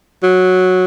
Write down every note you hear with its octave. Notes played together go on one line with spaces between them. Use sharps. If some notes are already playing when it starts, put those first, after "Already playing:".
F#3